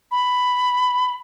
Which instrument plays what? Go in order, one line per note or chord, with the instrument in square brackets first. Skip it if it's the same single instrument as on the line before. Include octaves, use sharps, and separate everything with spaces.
[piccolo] B5